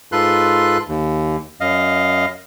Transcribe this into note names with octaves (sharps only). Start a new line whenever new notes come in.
G#2 F4 A4 B4 C6 F#6
D#2
F#2 D#5 F5